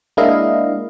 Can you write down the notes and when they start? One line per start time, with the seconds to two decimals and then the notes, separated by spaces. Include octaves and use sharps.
0.17 G#3 A#3 D4 E4 D#5 F5